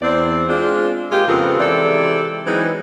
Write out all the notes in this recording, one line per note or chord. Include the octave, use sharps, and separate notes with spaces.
E2 C4 D5
G#3 C4 D4 F4
A#2 G#3 C4 F4 G4
F2 C#3 B3 C4 F4 A#4
C3 E3 G#3 A4 D5
E3 F#3 G#3 B3 C4 D#4